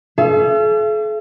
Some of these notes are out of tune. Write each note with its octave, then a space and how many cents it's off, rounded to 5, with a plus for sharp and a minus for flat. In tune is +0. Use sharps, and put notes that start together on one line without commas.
A4 -45 E5 +45